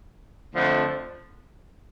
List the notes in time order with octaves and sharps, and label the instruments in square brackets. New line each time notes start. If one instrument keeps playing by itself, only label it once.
[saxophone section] F2 D3 F3 A3